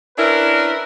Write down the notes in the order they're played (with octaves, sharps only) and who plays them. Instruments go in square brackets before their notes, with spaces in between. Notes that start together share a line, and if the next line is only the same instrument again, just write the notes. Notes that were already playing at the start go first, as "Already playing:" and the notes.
[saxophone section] C#4 D4 E4 [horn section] A#4 B4